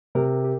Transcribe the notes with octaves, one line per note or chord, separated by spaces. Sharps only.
C3 A#4
G4